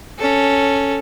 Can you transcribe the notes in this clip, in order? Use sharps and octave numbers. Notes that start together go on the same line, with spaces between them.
C#4 A4